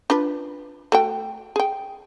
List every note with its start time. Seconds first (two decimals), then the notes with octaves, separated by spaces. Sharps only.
0.10 D4 F4 B4
0.92 A3 F#4 G5
1.56 G#4 G5